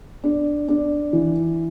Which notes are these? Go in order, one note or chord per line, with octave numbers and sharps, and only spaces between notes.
D4
D4
E3